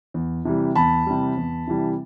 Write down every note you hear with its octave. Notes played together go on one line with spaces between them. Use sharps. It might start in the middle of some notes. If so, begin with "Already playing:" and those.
E2
C3 E3 G3
E2 A5 B5
C3 E3 G3
E2
C3 E3 G3